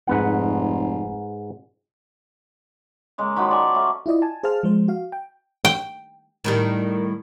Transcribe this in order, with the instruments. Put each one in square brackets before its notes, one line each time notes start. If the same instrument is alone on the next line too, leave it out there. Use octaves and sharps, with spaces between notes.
[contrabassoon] F1 [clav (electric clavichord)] G#2 B4 F#5
[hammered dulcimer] C#3 G#3 A#3
D#3 F3 F#3 B5
D5 G#5
A3 C#4
[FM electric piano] E4 F4 D5 D#5
G#5 A5
G#4 C5 F5 A5 F6
F3 G#3 C5
F#4 F5
G5
[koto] G5
[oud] A2 D#3 G3